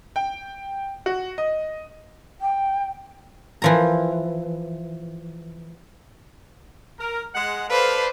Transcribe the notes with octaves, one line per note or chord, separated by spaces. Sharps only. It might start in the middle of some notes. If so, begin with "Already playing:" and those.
G5
F#4
D#5
G5
E3 F3 A#5
A#4
G#3 F#5
A4 B4 C5 D5 F5